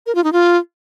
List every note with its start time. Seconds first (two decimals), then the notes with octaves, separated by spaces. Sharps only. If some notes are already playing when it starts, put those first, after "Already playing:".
0.06 A#4
0.15 F4
0.24 D#4
0.33 F4